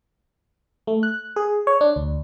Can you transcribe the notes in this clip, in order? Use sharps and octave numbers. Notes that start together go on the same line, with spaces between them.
A3
F#6
G#4
C#5
D4
D2